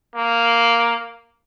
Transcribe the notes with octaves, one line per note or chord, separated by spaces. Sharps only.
A#3